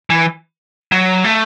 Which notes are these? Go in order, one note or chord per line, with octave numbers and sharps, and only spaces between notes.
E3
F#3
A3